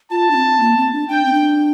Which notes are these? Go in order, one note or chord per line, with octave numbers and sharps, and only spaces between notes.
F4 A5
D4
C4
A#3
C4
D4
D4 G5
C4
D4